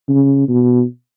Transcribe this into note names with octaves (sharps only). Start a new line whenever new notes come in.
C#3
B2